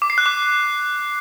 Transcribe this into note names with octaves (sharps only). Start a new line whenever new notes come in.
D6
C7
F#6
D6